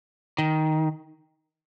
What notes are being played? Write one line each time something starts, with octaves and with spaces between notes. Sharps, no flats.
D#3